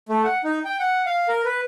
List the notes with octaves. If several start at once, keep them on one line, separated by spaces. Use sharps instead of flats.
A3
F#5
D#4
G5
F#5
F5
A#4
B4